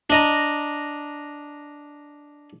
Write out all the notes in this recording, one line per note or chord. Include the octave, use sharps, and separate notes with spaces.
D4 D#5 A#5